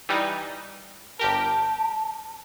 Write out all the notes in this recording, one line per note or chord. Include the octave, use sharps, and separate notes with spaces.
E3 G3 D#4
G1 G4 A#4 A5